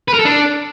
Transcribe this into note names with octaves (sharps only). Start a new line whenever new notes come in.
B4
A#4
A4
D4